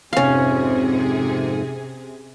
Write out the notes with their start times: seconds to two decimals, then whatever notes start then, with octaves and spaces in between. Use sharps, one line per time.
0.13 F2 G#2 C3 C#4 G#4 F5